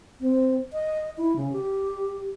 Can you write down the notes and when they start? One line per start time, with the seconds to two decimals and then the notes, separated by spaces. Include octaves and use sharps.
0.21 C4
0.73 D#5
1.17 E4
1.36 C#3
1.52 G4